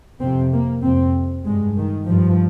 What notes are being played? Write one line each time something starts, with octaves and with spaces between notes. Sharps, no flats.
F2 C3 C4
A#3
F2 C3 C4
G2 G#3
D#3
G2 F3